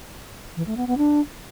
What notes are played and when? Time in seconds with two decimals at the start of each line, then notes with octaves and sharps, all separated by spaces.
0.56 E3
0.66 A3
0.77 B3
0.87 B3
0.97 D4